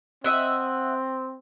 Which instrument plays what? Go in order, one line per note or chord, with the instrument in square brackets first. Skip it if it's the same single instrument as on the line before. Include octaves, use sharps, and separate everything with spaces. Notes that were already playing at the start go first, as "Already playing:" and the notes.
[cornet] C4 [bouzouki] D#5 E5 F#5